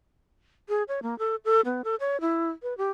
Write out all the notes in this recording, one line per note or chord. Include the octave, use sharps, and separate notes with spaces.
G#4
C#5
A#3
A4
A4
B3
A4
C#5
E4
B4
G4